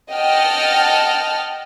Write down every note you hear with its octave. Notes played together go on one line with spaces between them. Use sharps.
D#5 F#5 G5 A5 F6